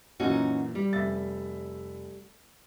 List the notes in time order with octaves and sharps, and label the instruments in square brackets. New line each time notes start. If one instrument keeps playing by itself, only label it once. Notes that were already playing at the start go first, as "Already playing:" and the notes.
[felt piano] F#2 A#2 E3 [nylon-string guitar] C#4 D#4 F#4
[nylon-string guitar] G3
[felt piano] F1 E5 A6